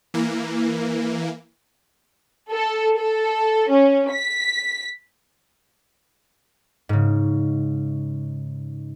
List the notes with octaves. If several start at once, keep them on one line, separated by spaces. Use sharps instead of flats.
E3 A#3
A4
A4
C#4
B6
G#2 C#3